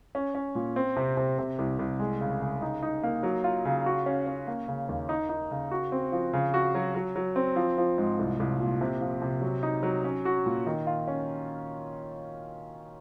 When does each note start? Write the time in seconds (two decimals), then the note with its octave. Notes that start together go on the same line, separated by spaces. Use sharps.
0.15 C#4
0.35 C#4
0.55 A#2
0.76 C4
0.96 C3
1.17 C3
1.39 C3
1.59 C2
1.79 C2
1.99 G#3
2.21 C#3
2.42 C#3
2.62 D#4
2.82 D#4
3.03 A#3
3.23 F#3
3.44 F4
3.65 C#3
3.86 F#4
4.06 C#4
4.27 C#4
4.47 A#3
4.68 C#3
4.89 D#2
5.09 D#4
5.29 D#4
5.51 C#3
5.71 F#4
5.92 C4
6.12 F3
6.33 C#3
6.54 F#4
6.75 F#3
6.95 F#3
7.16 F#3
7.36 C4
7.56 F3
7.78 F3
7.98 G#2
8.19 C2
8.40 C2
8.60 A#2
8.81 C3
9.01 F3
9.22 C3
9.42 F#3
9.63 D#4
9.83 F#3
10.04 C#4
10.25 F#4
10.46 A#2
10.67 D#3
10.87 F4
11.08 C#4